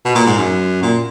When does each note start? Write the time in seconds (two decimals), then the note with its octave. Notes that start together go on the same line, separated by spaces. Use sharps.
0.05 B2
0.15 A#2
0.26 G#2
0.38 F#2
0.82 A#2